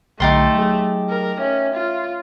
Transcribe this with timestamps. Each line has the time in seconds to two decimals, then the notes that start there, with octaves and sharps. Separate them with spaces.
0.20 B1 D3 A3 D#4 G4 C6 A6
0.55 F#3 G#4
1.09 A#4
1.40 C#4 E5
1.74 F4